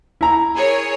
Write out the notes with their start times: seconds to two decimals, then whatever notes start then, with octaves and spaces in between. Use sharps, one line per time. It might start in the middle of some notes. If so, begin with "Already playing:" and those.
0.21 E4 A#5
0.53 G#4 A#4 C#5